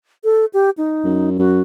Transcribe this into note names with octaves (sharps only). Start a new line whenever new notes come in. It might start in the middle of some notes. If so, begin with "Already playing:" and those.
A4
G4
D#4
F#2
F#2 F#4